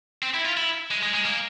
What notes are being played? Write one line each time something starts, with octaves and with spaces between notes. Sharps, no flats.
C4
E4
F4
E4
G#3
G#3
G#3
A#3